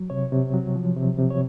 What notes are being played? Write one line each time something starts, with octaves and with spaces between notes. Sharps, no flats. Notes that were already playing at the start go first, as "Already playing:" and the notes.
Already playing: F#3
C3 C#5
C3
F#3
F3
C3
C3
C#5